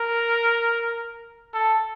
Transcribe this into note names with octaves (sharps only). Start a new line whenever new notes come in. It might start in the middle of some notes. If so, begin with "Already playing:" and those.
Already playing: A#4
A4